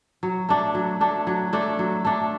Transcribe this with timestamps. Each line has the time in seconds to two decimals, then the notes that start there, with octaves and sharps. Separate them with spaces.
0.23 F#3
0.49 A3 D4
0.75 F#3
1.01 A3 D4
1.27 F#3
1.53 A3 D4
1.79 F#3
2.05 A3 D4